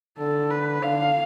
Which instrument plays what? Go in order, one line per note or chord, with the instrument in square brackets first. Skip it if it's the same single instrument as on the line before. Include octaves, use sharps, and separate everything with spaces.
[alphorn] D3 [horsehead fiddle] A4
[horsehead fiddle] B4
[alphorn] D3 [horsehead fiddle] F5